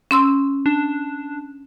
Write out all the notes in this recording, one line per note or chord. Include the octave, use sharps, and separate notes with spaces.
C#4 C6 E6
D4